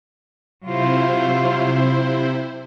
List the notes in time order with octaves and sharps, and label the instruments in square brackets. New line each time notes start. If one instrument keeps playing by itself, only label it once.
[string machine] C3 E4 C5 [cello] F#3 F4